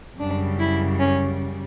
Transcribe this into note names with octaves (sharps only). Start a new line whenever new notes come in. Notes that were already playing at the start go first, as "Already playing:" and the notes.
F#2 C#3 G3 D4
E4
C#4